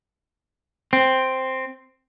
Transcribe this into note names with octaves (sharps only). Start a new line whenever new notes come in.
C4